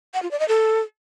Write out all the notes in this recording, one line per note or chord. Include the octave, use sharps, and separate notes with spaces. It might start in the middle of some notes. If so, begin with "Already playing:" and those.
F#5
F4
D5
D#5
A4